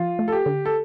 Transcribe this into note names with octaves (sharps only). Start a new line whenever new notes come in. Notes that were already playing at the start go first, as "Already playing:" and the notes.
Already playing: F3 F4
A3
A4
G4
D3
A4